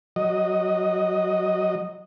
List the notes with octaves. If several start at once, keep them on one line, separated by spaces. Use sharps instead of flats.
F#3 D#5